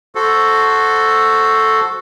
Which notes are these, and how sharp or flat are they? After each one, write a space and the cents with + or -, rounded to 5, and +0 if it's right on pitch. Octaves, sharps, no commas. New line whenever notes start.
F#4 +0 A4 +0 C5 +0